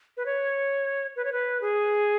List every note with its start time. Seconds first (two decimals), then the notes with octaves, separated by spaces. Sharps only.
0.17 B4
0.26 C#5
1.16 B4
1.25 C#5
1.32 B4
1.61 G#4